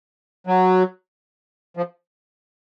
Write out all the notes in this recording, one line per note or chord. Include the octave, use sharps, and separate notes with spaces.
F#3
F3